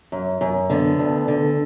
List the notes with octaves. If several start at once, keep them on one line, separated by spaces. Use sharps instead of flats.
F#2
F#2
D3 B3
D2
D3